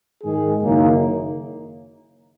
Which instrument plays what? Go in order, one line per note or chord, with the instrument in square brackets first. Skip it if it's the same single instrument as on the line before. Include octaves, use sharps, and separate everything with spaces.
[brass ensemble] G#2 D#3 G#3 G#4
F#1 F#2 D#3 A#3 D#4